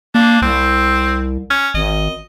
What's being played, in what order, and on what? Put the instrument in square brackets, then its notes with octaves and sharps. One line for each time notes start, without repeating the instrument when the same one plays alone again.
[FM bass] A#3 [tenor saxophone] D4
[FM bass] C2 [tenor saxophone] C4
[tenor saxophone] C#4
[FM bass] G#1 [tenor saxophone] D#5